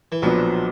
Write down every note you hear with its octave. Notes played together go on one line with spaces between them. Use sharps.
E3
B1 A#2 F3 F#3 B3 D4